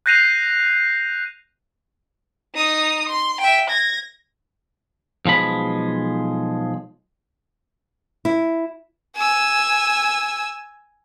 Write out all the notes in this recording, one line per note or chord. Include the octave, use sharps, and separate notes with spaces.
F#6 G6 A#6 C7 D#7 F7
D#4 D#6
C6
E5 G5
G#6 A#6
B1 F3 G#3 B5
E4
G#5 E6